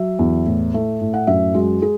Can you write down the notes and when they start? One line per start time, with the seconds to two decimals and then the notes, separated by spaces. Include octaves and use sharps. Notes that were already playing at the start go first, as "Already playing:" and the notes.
Already playing: F#3 E5
0.19 E2
0.46 A2
0.74 A3
1.01 A2
1.14 F#5
1.27 F#2 E5
1.54 G#3 F#4
1.82 G#4